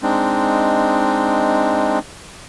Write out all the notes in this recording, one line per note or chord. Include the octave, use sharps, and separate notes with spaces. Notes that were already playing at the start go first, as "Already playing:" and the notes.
G#3 C4 D4 D#4